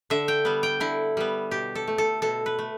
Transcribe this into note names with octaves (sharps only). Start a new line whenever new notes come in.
D3 E5
G5
G3 B3
G5
D3 E4
G3 B3
B2 G4
A4
A3
A4
B2 A4
B4
A3